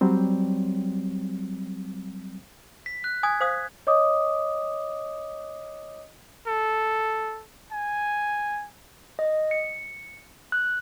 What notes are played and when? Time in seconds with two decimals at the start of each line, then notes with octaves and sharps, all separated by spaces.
0.01 F#3 G3 C4
2.86 B6
3.04 F#6
3.23 G#5 D#6 G#6
3.40 C5 F5 D#6
3.87 C#5 D#5 D6 D#6
6.47 A4
7.72 G#5
9.19 D#5
9.51 C#7
10.52 F#6